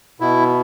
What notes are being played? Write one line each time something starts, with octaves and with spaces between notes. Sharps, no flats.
B2 E4